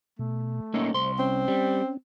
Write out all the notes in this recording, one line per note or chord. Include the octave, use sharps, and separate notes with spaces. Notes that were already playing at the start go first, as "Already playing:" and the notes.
B2 A3
A#3 C#4 D#4 E5 C6 C#6
C2 C5 C6
C4 C#4
G3